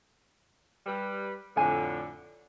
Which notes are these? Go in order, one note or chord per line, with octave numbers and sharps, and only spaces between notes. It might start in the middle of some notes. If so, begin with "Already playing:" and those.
G3 B4
F2 A2 D3 G#5